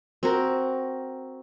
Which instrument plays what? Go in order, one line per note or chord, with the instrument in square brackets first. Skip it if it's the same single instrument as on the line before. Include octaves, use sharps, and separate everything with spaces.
[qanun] C4 F#4 A#4